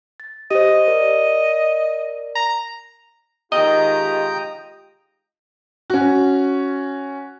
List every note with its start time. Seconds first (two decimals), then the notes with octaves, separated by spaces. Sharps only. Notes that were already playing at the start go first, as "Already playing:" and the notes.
0.20 A6
0.51 G4 C5 D#5
0.88 A#4 D5
2.35 A#5
3.52 D#3 G#3 F4 G4 D#5 G5 A#5 D#6
5.90 C#4 F#4